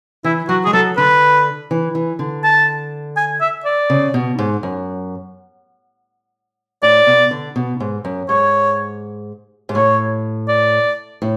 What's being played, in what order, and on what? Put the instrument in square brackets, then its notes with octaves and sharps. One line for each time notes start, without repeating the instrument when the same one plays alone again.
[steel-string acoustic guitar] E3 [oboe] E4
[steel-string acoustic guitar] F#3 [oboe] F#4
[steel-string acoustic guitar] G#3 [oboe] G#4
[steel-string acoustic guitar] F#3 [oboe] A4
[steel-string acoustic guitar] D3 [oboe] B4
[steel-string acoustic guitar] E3
E3
D3
[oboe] A5
G#5
E5
D5
[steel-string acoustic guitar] C#3
B2
G#2
F#2
[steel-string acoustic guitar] A2 [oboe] D5
[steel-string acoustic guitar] B2
D3
B2
G#2
F#2
[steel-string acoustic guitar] G#2 [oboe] C#5
[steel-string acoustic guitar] G#2
[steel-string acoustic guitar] A2 [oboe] C#5
[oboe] D5
[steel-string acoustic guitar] A2